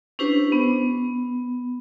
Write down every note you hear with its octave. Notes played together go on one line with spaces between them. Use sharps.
C#4 D4 E4 G4 B4 C5
B3